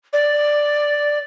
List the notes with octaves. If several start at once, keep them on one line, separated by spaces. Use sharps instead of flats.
D5